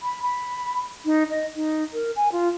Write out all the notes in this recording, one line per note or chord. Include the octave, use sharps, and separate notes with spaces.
B5
B5
D#4
D#5
D#4
A#4
G#5
F4